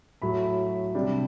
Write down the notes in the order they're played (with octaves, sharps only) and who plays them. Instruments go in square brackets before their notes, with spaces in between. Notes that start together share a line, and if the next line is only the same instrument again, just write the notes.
[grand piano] A2 F#3 A3 B5
C3 G3 D4